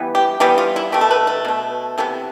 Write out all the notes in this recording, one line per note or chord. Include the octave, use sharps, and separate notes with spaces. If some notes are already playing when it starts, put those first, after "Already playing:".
Already playing: E3 G3 B3
G4
E3 G3 B3 G4
F4
E4
B2 A3 G4
A4
B4
A4
B2 A3
C3 E3 B3 A4